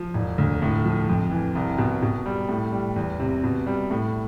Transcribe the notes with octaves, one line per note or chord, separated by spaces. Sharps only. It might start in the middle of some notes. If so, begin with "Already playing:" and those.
Already playing: F3
E1
D2
A2
F3
F2
E3
C2
B2
B2
G3
A2
G3
E2
C3
B2
G3
A2